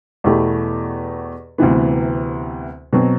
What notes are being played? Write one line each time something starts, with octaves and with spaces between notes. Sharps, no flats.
E2 B2 A3 E4 G4
D2 C3 E3 B3
B2 F#3 C4